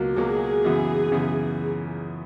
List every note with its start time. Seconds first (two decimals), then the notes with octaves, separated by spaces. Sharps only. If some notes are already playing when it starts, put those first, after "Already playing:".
Already playing: C#2 B2 F#3 A#3
0.16 C#2 B2 F#3 A#3 G#4
0.64 F#2 C#3 E3 B3
1.12 F#2 C#3 E3 B3